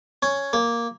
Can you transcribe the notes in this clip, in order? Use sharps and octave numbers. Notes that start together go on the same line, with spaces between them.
C#4
A#3